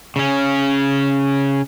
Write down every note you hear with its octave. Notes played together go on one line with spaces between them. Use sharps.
C#3 C#4